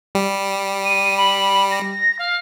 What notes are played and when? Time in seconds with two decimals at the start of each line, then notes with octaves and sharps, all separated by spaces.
0.15 G3
0.84 D#7
1.17 B5
1.71 A#6
2.19 F5